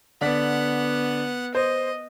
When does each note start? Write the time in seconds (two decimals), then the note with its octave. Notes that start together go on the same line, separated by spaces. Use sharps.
0.21 D3 B3 D5 F#5 B6
1.55 C5 D#5